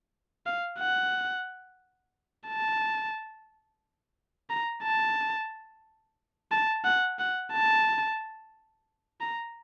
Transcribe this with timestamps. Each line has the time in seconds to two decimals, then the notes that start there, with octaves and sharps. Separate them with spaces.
0.46 F5
0.79 F#5
2.48 A5
4.50 A#5
4.83 A5
6.52 A5
6.85 F#5
7.19 F#5
7.53 A5
9.21 A#5